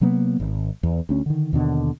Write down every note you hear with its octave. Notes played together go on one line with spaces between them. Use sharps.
C3 F#3 A#3 B3
G#1
E2
D2 C#4
D3 D#3
D#2 B2 D3